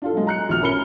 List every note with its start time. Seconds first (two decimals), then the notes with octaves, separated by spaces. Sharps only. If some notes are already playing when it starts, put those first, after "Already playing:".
0.02 D4 F4 A4
0.13 F#3 G#3
0.27 A#5 F#6 C#7
0.49 A#1 B2 F6 F7
0.62 C#4 A#4 B5 F6 C#7 G7